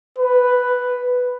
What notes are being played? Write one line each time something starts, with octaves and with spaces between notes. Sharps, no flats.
B4